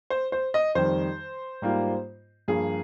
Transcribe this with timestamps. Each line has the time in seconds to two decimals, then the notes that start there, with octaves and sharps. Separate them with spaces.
0.10 C5
0.32 C5
0.54 D#5
0.75 F2 D#3 G3 C5
1.62 G#2 G3 A#3 F4
2.48 G2 F3 A#3 G#4